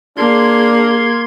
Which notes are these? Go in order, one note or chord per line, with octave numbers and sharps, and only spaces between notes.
A#3 D4 G#4 C6 G#6